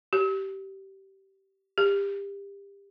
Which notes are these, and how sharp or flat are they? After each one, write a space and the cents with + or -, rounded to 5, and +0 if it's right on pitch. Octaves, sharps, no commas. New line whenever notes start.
G4 -20
G4 +25